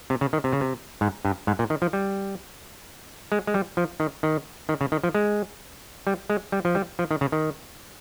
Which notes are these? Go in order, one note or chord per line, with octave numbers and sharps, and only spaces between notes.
C3
C#3
D#3
C3
C#3
C3
G#2
G2
G#2
A#2
D#3
F3
G3
G#3
G#3
G3
F3
D#3
D#3
D#3
C#3
D#3
F3
G#3
G3
G#3
G3
F3
G3
F3
D#3
C#3
D#3